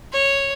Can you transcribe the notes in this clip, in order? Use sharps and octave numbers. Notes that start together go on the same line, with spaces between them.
C#5